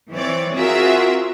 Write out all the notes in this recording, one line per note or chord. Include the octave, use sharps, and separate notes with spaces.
E3 C4 C#5 D5
C4 F4 F#4 G#4 A#4 E5